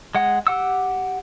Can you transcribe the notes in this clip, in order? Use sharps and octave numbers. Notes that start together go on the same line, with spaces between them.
G#3 F#5
G4 F#5 E6